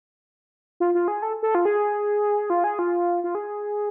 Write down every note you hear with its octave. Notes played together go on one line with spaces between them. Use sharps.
F4
F4
G#4
A4
A4
F4
G#4
F4
G#4
F4
F4
G#4